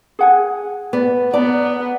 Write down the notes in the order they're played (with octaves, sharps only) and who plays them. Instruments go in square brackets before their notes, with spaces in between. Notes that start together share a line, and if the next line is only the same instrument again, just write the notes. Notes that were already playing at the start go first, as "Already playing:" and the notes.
[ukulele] G#4 F#5 G#5
[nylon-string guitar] B3 [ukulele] D5
[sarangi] B3 [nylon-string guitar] D5 [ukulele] A#5